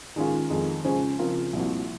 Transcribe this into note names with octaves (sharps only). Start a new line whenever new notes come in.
D#3 G#3 C#4 F4
F2 D#3 G#3
C#3 G#3 C#4 F4 C5
C#3 F3 C4 F4 A#4
C2 A#2 F3 C4 F#4